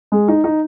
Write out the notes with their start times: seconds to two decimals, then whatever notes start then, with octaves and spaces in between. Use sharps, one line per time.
0.12 G#3
0.28 D#4
0.44 D#4